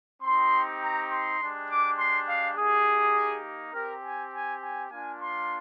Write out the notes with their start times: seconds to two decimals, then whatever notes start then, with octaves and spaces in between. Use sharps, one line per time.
0.22 C4 D#4 G4 C6
0.81 A#5
1.10 C6
1.40 G#3 D4 G4
1.69 D6
1.98 C6
2.27 F5
2.56 A#3 D#4 G4 G#4
3.73 C4 G4 A#4
4.02 G#5
4.32 G#5
4.62 G#5
4.91 A#3 D4 F4 G#5
5.20 C6